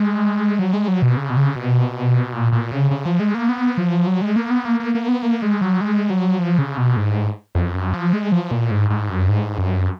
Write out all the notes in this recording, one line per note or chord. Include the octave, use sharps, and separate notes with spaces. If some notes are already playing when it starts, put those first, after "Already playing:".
Already playing: G#3
F#3
G#3
F#3
B2
C#3
B2
C#3
B2
A#2
A#2
C#3
C#3
F3
G#3
A#3
B3
F3
F#3
G#3
A#3
B3
A#3
A#3
A#3
B3
A#3
G#3
F#3
G#3
F#3
F3
C#3
B2
G#2
F2
F#2
F3
G#3
F3
A#2
G#2
G#2
F#2
G#2
F#2